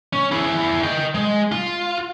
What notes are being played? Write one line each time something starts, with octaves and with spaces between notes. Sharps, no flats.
C#4
E4 G#4
D#5 G5
G#3
F4